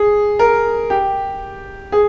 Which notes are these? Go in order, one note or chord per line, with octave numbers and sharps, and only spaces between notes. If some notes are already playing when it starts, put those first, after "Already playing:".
Already playing: G#4
A#4
G4
G#4